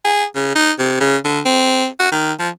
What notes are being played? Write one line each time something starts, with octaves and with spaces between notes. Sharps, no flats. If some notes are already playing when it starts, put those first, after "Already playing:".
G#4
C#3
D#4
C3
C#3
D3
C4
F#4
D#3
F3